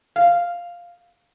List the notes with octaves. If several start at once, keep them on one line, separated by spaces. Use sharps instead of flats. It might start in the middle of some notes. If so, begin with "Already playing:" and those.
F5